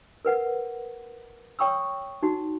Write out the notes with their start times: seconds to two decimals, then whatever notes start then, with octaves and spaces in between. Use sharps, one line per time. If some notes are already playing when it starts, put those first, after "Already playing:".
0.25 A#4 B4 F#5
1.59 C#5 G5 C#6 D#6 E6
2.23 D#4 F#4